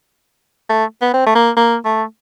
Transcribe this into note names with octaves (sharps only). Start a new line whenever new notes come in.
A3
B3
C4
A3
A#3
A#3
A3